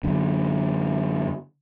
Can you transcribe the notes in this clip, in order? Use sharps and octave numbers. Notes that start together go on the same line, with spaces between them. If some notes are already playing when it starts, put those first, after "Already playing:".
F#2 D3